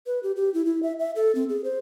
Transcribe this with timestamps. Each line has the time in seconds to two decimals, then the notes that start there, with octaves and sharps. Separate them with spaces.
0.06 B4
0.23 G4
0.36 G4
0.54 E4
0.65 E4
0.83 E5
0.99 E5
1.16 A4
1.35 C4
1.49 G#4
1.64 C5